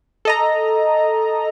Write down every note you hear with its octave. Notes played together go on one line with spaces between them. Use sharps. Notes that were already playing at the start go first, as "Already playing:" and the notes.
A4 D#5 A#5